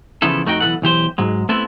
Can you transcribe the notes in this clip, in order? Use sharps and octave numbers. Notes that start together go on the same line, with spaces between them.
C#3 E3 F3 B3 E4 A4
F2 A3 D#4 F#4 G5
B1 E3 G3 A4 B4 F#5
B1 E3 G4 C5
G#2 F#3 G#3
A3 B3 C4 E4 A4